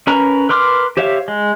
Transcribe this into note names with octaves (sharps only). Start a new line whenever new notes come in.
C#4 A#4 B4 A#5
A#4 B4 C6 D6 F6
G4 C5 C#5 E5 F5
G#3